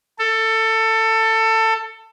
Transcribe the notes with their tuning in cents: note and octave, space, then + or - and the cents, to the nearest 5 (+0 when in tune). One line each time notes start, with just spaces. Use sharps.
A4 +20